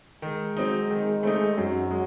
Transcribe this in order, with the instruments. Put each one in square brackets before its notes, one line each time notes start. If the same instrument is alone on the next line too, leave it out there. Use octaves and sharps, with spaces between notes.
[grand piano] D#3 [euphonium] G#3
[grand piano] F#3 C4 D#4
D#3
A3 C4 D#4
[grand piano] F#2 [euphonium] F#3
[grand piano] G#3